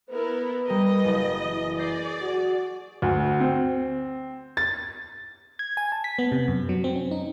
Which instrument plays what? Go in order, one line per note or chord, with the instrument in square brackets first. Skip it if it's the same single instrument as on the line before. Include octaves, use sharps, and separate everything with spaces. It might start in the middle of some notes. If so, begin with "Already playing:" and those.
[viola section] B3 E4 A#4 [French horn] B4
[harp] G3 A#4 [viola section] D#5
[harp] F#1
[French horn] E3
[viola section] G#4 D5 [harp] G6 A#6 C7
[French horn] F#4
[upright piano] D2
C4
A6
[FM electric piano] G#6
G#5
A5
B6
B3
C3
F#2
F#3
C4
C#4
D#4